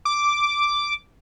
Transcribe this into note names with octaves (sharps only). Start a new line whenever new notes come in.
D6